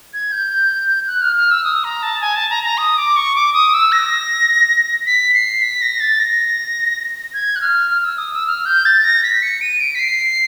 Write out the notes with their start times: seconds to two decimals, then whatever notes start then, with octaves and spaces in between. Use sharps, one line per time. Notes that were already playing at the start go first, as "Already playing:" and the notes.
0.13 G#6
0.32 G6
1.07 F#6
1.22 F6
1.36 F6
1.51 E6
1.64 D#6
1.84 A#5
2.03 A5
2.21 G#5
2.36 A5
2.50 A#5
2.64 A#5
2.78 D#6
2.97 D6
3.16 C#6
3.36 D6
3.54 D#6
3.74 E6
3.92 A#6
5.06 B6
5.34 C7
5.62 B6
5.82 A#6
6.00 A6
6.20 A#6
7.34 G#6
7.56 F#6
7.61 F6
7.91 F6
8.04 E6
8.18 D#6
8.33 E6
8.47 F6
8.66 G6
8.86 A6
9.04 A#6
9.23 B6
9.42 C#7
9.61 D#7
9.80 D7
9.95 B6
9.99 C7